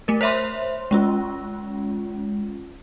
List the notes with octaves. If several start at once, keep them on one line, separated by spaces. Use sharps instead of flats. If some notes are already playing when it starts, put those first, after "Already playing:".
A3 A#4
C5 C#5 E5 B5 C6
G#3 C#4 F4